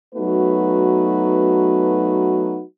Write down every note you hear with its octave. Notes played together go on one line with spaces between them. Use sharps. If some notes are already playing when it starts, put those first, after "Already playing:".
F#3 A3 B3 D#4 F#4 B4